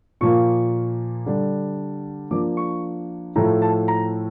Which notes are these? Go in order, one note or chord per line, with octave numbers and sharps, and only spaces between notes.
A#2 F3 A#3 C#6
D3 G3 D4
F3 A#3 D4 D6
C#6
A2 F3 A3 E4 A#5
A5
A#5